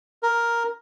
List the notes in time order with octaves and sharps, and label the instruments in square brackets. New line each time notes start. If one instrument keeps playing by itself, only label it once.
[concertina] A#4